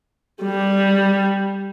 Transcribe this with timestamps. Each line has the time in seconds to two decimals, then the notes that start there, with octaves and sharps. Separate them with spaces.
0.42 G3